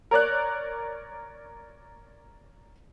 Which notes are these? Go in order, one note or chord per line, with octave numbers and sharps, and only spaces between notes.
A#4 C#5 D5 F#6